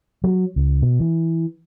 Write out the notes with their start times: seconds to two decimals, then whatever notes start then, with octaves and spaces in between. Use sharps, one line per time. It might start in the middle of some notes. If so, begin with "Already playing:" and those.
0.24 F#3
0.56 C#2
0.82 B2
1.00 E3